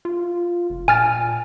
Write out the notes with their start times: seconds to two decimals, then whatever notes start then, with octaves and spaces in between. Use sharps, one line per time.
0.05 F4
0.70 F1
0.88 A#2 G#5 F6 A6